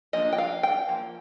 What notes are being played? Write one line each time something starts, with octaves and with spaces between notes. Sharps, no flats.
F3 A#3 D4 D#5
G5
F5
G5
F3 A#3